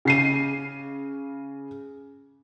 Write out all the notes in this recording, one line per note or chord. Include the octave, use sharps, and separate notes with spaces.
C#3 C7 D#7